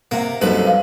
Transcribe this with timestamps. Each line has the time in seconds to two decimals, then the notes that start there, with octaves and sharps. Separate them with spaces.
0.11 C3 A#3 F#5
0.41 C2 F#2 D#4 A4 B4 C5
0.67 F5